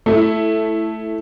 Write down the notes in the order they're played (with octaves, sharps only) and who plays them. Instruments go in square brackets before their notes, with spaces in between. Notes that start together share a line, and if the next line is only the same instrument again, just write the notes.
[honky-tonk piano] A3 E4